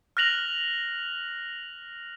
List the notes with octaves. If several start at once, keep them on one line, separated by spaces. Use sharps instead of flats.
F6 F#6 A#6 F7 F#7